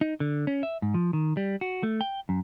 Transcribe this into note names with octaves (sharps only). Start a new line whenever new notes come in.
D#4
D3
C#4
E5
G#2
F3
D#3
G3
F#4
A3
G5
F#2